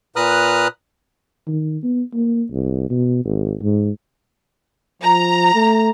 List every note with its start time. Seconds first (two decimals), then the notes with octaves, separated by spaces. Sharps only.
0.16 A#2 B4 A#5 D#6 F6 F#6
1.48 D#3
1.83 B3
2.14 A#3
2.51 C2
2.90 B2
3.25 G#1
3.63 G#2
5.02 F3 A#5
5.54 A3